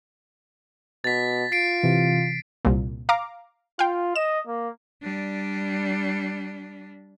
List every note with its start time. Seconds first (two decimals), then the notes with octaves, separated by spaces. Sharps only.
1.04 B2 A6 B6
1.52 F4 C7 D7
1.83 C3 E3
2.65 C2 A#2
3.09 F5 A#5 D6
3.79 F4 F5 G5
4.16 D#5 E7
4.47 A#3
5.03 G3 D4